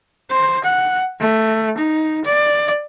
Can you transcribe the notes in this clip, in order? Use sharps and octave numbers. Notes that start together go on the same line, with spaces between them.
C5
F#5
A3
D#4
D5